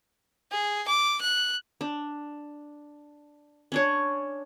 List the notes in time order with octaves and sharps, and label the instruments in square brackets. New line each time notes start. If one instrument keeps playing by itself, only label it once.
[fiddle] G#4
D6
F#6
[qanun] D4
C#4 D4 C#5